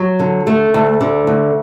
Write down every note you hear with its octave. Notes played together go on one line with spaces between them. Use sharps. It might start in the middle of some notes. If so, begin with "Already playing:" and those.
Already playing: F#3
D3
A3
D2
D3
D2